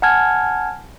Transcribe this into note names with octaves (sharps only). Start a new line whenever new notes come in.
F#5 G#5 A5 F6 G#6